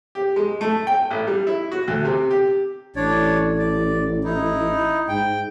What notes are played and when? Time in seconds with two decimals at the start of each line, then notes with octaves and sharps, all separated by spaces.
0.15 G4
0.36 G#3
0.61 A3
0.87 G5
1.10 A1
1.27 G3
1.47 E4
1.72 F#4
1.88 D2
2.05 C3
2.31 G4
2.96 A1 D4 C#5 D5
3.59 D5
4.24 D#4 E4
5.08 G#2 G5